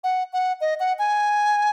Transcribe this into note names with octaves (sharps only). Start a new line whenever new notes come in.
F#5
F#5
D#5
F#5
G#5